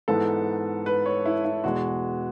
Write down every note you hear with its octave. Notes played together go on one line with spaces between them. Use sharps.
G#2 E3 B3 D#4 A4
B4
C#5
E4
E4
E2 B2 G#3 F#4